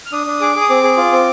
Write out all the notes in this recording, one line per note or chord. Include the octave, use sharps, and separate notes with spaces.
F6
D4 D#6
D4
G#4 D6
G#4
D#6
C4 D6
G#4
F4
C4